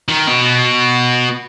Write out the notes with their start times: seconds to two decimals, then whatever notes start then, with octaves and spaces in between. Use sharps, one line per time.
0.08 D#3
0.27 B2